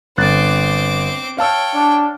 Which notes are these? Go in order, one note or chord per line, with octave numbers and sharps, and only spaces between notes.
G1 C4 D6 F#6 A6
C#5 F5 G5 A5 E6
D4